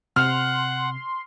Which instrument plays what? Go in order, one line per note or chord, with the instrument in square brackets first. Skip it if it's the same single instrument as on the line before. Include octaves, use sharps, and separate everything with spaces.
[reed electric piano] C3 [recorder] F#5 [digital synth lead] C6 [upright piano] F6